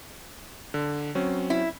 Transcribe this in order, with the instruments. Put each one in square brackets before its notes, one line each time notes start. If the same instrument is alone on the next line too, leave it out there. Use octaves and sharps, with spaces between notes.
[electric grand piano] D3
F#3 C4 C#4
[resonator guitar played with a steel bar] E4